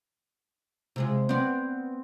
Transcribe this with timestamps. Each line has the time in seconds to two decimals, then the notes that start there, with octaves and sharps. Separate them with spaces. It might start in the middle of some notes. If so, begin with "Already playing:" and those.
0.96 C3 G#3 F4
1.29 B3 C4 D5